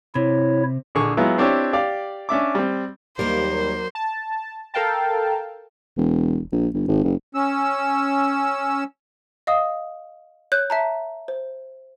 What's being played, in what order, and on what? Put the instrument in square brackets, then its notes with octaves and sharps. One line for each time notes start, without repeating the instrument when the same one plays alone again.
[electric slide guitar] C3 [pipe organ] E4 C#5
[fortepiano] A#1 D3 G#4 C#6
F#3 G#3 B3 E4 F4
C4 D4 E4 G4 C#5
G4 D5 F5
C#4 D4 E5 D6
G3 C4
[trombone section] D#2 [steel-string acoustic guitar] F#3 A#3 A#4 [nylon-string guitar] G3 [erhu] C5
[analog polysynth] A5
A4 A#4 F5 G5 A5
[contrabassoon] E1
A#1
G1
G#1
F#1
[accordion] C#4 E6
[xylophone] D#5 F5 D#6
C#5 F#6 G6
E5 A5 A#5
C5